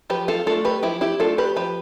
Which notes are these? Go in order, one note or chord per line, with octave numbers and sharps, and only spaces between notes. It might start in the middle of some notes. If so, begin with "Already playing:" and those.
F3 G4 B4
F4 A4
A3 D4 F4 A4
G4 B4
F3 E4 G4
E4 G4
A3 D4 F4 A4
G4 B4
F3 G4 B4